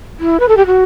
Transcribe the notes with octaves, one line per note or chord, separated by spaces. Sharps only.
E4
B4
A4
G4
F#4